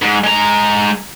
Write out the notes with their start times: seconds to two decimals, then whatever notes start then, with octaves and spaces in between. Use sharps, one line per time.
0.02 G#2
0.24 G#3 A#5